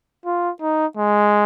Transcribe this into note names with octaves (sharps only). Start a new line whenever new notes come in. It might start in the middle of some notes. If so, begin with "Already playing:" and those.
F4
D#4
G#3